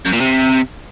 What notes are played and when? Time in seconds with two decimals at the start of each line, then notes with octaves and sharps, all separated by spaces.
0.06 F#2
0.13 A#2
0.20 C3